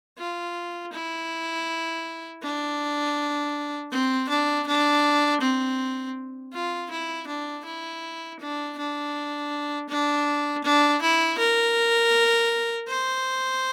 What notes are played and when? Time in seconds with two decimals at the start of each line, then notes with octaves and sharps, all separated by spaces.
0.18 F4
0.93 E4
2.42 D4
3.91 C4
4.29 D4
4.67 D4
5.41 C4
6.53 F4
6.90 E4
7.27 D4
7.65 E4
8.40 D4
8.78 D4
9.89 D4
10.64 D4
11.02 E4
11.38 A#4
12.88 C5